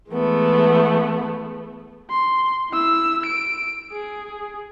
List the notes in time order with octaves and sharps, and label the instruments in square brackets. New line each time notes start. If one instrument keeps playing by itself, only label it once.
[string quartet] E3 G#3 A3 B3
[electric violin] C6
E4 E6
D7
G#4